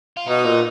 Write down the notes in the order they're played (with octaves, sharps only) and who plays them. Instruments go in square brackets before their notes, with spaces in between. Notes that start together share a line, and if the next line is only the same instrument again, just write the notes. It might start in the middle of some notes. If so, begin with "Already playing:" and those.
[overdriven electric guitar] F4
[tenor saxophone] B2 [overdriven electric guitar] D#4
[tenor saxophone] A#2